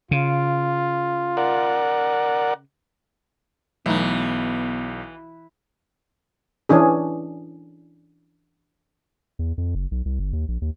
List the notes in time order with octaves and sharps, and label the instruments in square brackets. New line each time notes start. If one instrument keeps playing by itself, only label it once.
[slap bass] C#3 [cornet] F4
[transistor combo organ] A#4 D5 F#5
[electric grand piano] B1 [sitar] E3 [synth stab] F#3 A3 D#4 [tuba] B3
[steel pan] E3 C#4 D4 G#4
[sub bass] E2
F2
F#1
B1
C2
G1
D#2
A#1
D#2